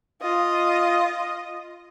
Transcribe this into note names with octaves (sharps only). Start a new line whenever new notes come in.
F4 D#5